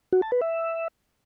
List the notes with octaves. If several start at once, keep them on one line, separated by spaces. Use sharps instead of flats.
F#4
A5
B4
E5